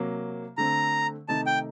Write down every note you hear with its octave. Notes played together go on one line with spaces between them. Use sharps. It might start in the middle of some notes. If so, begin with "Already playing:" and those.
Already playing: C3 F#3 A#3
D3 A3 C4 A#5
C3 D#3 A3 D#4 A5
G5